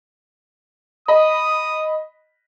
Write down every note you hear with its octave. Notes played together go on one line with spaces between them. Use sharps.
D#5 B5 D#6